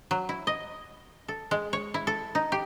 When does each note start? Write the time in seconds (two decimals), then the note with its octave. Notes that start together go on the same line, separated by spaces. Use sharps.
0.11 F#3
0.29 E4
0.47 D#5
1.28 A4
1.51 G#3
1.73 C#5
1.94 E4
2.07 A4
2.35 D#4
2.52 G4